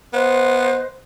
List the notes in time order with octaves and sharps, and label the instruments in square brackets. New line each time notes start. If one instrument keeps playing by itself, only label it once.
[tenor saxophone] B3 [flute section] C5 D#5 F#6